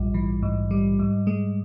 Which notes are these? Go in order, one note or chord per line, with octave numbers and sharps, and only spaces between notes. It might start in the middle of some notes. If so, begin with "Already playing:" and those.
Already playing: A#1 G#2 G3
E3
G#2
G3
G#2
G#3